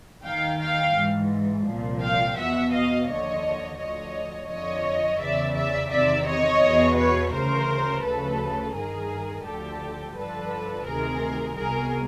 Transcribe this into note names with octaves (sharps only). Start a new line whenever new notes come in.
D#2 D#3 F5 G5
F5 G5
G#2 E3
C2 A#2 F3
F5 G5
E2 B2 E5 F#5
D#5 F5
D#2 D3 F3 C#5 D#5
D2 D3 F3 C#5 D#5
F2 D3 F3 C#5 D#5
E2 C#3 E3 D5 E5
D5 E5
E2 C3 D#3 D5 E5
C#5 D#5
E2 B2
B4 C#5
D2 C#3 E3 A#4 C5
D2 C#3 F3 A4 B4
G2 D#3 G#4 A#4
D2 D3 F3 G4 A4
G2 D3 F3 A4 B4
D2 C3 D#3 G#4 A#4
C2 B2 G#4 A#4